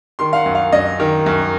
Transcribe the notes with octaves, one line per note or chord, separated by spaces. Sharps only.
D#3 C6
F5
F#5
F#2
F5
F#2 D#5
D#3
F#2